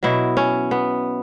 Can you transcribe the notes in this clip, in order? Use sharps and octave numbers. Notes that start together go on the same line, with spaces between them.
B2 F#3 E4
C#4
B3